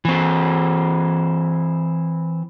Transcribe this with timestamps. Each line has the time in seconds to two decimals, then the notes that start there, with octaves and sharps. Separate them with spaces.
0.05 E3 C4